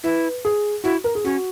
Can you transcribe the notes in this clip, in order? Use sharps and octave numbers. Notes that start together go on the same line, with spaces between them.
E4 B4
G#4
E4 F#4
A#4
G#4
C#4 F#4